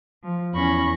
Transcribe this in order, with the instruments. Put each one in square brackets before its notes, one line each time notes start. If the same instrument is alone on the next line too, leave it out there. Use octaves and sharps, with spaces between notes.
[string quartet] F3
[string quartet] E2 C#6 A#6 [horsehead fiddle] C#4 B5